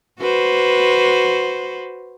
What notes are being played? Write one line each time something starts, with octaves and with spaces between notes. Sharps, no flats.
F#4 B4 C5